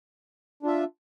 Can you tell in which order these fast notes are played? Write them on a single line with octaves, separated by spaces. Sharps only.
D4 F4 E5